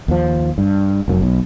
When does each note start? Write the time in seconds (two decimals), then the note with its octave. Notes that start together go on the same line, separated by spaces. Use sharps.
0.08 D#2 F3
0.58 G2
1.08 F1 F#2
1.22 B1